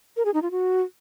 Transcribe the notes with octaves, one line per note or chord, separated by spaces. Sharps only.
A#4
G#4
D#4
F4
F#4